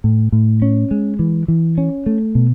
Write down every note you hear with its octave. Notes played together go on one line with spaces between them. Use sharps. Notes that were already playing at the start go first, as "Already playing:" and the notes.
A2
A2
C#4
G#3
E3
E3
C#4
A3
B2